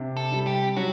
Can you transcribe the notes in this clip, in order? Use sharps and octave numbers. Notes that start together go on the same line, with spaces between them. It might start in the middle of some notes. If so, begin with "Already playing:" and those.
Already playing: C3 D4
A4
G3
G4
F#3 F#4